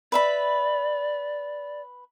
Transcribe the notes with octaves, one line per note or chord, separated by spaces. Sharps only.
B4 D5 E5 B5